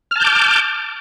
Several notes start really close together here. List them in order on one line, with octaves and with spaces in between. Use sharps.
F6 A5 G6 D6